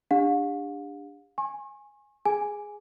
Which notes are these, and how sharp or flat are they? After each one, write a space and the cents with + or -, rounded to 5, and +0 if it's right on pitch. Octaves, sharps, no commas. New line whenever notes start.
D4 +0 G4 +40 F5 +45
G#5 +0 C#6 -45
G#4 +0 G#5 +0